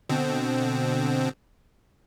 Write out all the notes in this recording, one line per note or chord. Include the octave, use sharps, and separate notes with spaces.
B2 D3 C4